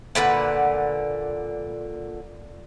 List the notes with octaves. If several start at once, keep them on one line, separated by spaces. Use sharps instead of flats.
A#2 D3 B4 F#5